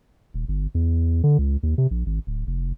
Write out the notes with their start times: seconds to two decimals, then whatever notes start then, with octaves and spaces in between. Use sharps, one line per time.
0.34 D#1
0.48 G1
0.75 E2
1.24 D3
1.38 C#2
1.63 D#2
1.78 C3
1.91 A#1
2.06 G#1
2.27 D1
2.47 F1